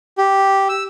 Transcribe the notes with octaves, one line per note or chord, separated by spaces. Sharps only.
G4
E6